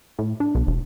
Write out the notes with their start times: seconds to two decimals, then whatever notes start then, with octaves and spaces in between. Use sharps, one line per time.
0.19 A2
0.40 D4
0.55 B1
0.67 E1